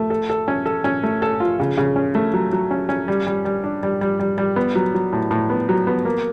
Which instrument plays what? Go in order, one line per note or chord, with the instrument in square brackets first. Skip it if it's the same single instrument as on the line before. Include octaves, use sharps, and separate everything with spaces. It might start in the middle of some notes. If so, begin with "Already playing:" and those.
Already playing: [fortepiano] A3
A4
A4
C#4
A4
C#4
A3
A4
F4
C#3
C#3
C#4
A3
F#3
F#3
C#4
C#4
G3
G3
G3
D4
G3
G3
G3
G3
B3
F#3
F#3
A2
A2
B3
F#3
B3
A#3